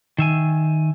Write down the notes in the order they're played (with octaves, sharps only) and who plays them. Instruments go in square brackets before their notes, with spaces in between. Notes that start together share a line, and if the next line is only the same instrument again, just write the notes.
[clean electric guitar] D#3 E5 G#5